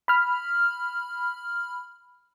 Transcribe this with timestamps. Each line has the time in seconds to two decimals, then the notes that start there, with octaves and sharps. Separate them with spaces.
0.08 B5 F6